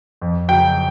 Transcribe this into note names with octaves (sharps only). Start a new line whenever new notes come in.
F2
C#3 F#3 G5